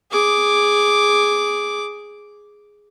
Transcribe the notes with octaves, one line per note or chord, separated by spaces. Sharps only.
G#4 D6